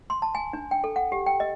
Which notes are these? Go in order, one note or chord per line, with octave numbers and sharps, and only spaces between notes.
C6
A5
G#5
D4
G5
A4
F#5
G4
G5
D#5